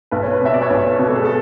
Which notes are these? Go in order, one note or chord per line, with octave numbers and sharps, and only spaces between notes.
B1 B4
C#5
B4
B2 E5
D5
C#5
B1 B4
B2 B4
A4
G#4
A4